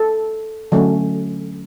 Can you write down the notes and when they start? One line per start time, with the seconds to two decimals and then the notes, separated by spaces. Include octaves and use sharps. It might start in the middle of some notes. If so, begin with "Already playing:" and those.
Already playing: A4
0.72 D3 F#3 A3 C#4